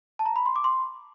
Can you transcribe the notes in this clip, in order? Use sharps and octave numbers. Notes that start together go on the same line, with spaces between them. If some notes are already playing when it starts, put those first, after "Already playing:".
A5
A#5
B5
C6
D6
C6